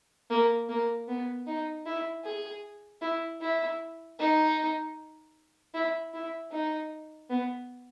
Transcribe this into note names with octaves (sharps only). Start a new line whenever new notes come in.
A#3
A#3
B3
D#4
E4
G#4
E4
E4
D#4
E4
E4
D#4
B3